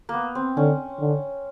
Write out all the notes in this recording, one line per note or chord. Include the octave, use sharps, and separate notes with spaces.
A#3 B3
C4
D3 C#4
D3